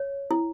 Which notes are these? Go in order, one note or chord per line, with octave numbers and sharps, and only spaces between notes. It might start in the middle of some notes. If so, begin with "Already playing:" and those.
Already playing: C#5
E4